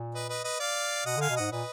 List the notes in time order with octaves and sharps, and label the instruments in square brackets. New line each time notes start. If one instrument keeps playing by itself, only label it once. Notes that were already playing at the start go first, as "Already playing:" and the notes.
Already playing: [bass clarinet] A#2
[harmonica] B4 D#5
B4 D#5
B4 D#5
D5 F5
[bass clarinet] B2 [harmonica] D#5 F#5
[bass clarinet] D3
[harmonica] F5 G#5
[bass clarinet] B2
[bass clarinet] G#2 [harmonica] D#5 F#5
[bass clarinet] A#2 [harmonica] B4 D#5